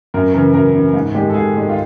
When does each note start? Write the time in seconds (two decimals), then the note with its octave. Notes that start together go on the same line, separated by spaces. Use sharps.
0.14 F#2 A#4
0.34 C#3 E3 A#4
0.54 F#2 A#4
0.74 C#3 E3
0.94 G#2
1.14 D#3 G#3 G4
1.29 A4
1.34 G#2 G#4
1.54 D#3 G#3
1.69 F4